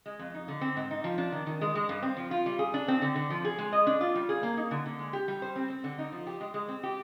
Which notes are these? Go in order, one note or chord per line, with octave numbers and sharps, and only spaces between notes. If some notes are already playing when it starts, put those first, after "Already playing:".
G#3
F2
D#4
D3
C4
G#2
D#4
F3
D4
D#3
D#3
G#3
G#3
G2
C4
F3
F4
G3
G#4
D4
C4
D3
D3
F3
G#4
G#3
D#5
D4
F4
G3
G#4
A#3
D#4
D3
D3
G#3
G4
G3
C5
C4
C4
D3
D#4
F3
G4
G#3
G#3
C4
G4